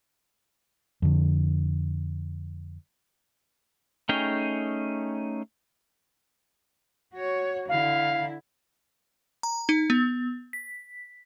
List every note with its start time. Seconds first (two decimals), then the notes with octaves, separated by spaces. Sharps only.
1.02 F2 D3
4.09 A3 C#4 D#4 G#4 G5
7.13 F#4 C#5
7.69 D3 E4 F5
9.43 A#5
9.69 D#4
9.90 B3
10.53 B6